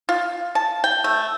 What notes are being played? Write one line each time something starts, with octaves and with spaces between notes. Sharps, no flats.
F4
A5
G5
A3